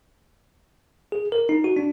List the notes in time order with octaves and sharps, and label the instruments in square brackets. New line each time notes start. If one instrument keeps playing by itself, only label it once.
[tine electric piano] G#4
A#4
D#4
F#4
D4